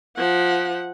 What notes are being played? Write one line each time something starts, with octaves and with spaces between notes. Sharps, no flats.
F3 F#5